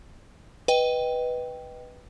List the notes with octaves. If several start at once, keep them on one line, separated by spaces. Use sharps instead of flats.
B4 D#5 G5